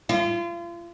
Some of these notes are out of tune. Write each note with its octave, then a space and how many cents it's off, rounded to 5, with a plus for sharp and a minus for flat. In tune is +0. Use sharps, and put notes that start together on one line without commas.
F4 -35